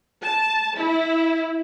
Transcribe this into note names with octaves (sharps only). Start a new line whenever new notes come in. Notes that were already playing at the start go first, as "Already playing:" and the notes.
A5
E4